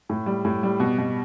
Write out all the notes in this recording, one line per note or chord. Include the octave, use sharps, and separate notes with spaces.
A2
G3
A2
G3
B2
B2